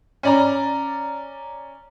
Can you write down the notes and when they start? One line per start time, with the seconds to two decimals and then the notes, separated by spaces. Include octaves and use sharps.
0.23 C#4 D5 A#5